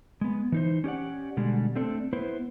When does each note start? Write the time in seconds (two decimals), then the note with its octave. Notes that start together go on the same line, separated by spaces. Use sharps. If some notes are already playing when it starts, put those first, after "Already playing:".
0.21 G#3 B3
0.52 E3 D#4 C5
0.84 C#4 G4 D5 F#5
1.37 B2 D3 G3 G#3
1.76 A3 C4 D4 A4
2.13 B3 E4 B4 C5